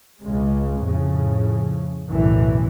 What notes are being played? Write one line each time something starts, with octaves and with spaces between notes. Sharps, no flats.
C#2 C#3 G#3
F2 A2 C#3
B1 F#2 A2 D3 E3